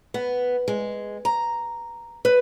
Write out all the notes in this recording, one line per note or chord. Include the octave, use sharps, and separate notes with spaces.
B3
G#3
A#5
B4